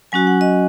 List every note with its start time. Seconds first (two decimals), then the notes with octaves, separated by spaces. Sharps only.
0.12 F#3 C#4 F#4 G#5
0.27 F#5
0.41 D#5